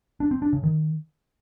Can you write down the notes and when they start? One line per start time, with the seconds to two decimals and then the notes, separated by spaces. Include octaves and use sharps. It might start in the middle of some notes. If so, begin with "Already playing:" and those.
0.20 D4
0.31 C4
0.42 D4
0.53 C#3
0.64 D#3